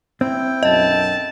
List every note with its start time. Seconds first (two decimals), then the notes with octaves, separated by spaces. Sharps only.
0.21 C4 E4 G5
0.63 B1 F#2 D#5 A5